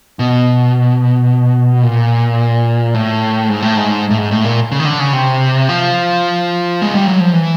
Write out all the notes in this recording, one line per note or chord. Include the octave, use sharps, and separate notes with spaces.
B2
A#2
A2
G#2
A2
G#2
A2
G#2
A2
A#2
C#3
D#3
D3
C#3
C3
F3
G#3
G3
F#3
F3
E3